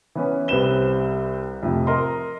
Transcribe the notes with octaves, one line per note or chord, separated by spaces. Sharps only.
E3 B3 C#4
C2 G3 C4 B4 E7 G7
F2 A2 C3
A#4 D#5 C6